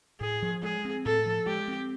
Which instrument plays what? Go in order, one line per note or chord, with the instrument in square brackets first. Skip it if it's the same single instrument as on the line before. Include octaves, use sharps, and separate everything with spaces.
[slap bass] A2 [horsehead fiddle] G#4
[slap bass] F3
[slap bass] G#3 [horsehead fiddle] G#4
[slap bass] C4
[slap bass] A2 [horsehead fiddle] A4
[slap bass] F3
[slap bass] G#3 [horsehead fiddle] G4
[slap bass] C4